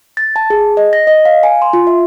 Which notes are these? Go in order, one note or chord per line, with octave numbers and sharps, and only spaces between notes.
A6
A5
G#4
D#5
A#6
D#5
F5
G#5
C6
F4
E5